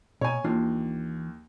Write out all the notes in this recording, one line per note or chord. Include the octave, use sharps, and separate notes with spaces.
B2 C#5 G#5 A#5
D#2 E3 D4 F4